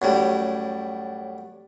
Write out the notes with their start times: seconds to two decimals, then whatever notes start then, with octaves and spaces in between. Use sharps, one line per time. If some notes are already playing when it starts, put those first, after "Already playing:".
0.02 F#2 A2 G3